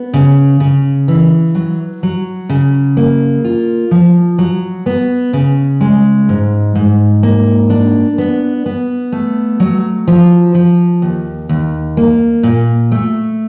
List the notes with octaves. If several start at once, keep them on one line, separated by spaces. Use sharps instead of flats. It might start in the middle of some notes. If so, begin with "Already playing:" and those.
Already playing: B3
C#3
C#3
E3
F#3
F#3
C#3
A#3
F4
F3
F#3
B3
C#3
G#3
G#2
G#2
A#3
D4
B3
B3
A3
F#3
F3
F3
D#2
D#2
A#3
A#2
A3